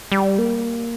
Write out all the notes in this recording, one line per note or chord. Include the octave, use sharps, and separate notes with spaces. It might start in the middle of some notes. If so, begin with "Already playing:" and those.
G3
A#3